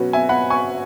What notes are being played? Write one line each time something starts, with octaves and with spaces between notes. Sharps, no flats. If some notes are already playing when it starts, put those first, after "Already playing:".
Already playing: B2 F#3 C#4 F#4 B4
E5 G#5
F#5 B5
G#5 C#6